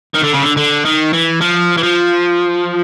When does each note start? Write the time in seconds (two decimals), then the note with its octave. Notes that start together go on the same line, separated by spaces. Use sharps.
0.15 D#3
0.24 D3
0.34 C#3
0.43 D3
0.57 D3
0.85 D#3
1.13 E3
1.41 F3
1.77 E3
1.83 F3